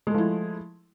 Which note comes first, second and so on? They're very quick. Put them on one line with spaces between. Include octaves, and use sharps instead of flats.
G#3 A3 F3 E4